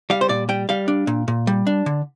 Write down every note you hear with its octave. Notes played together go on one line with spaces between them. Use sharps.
G3 F5
C5
A#2 D5
G3 G5
G3 F5
D4
A#2
A#2
G3
D4
D3